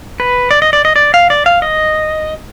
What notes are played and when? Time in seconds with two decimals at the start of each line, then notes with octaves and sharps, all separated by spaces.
0.20 B4
0.51 D5
0.62 D#5
0.73 D5
0.85 D#5
0.96 D5
1.14 F5
1.30 D5
1.46 F5
1.62 D#5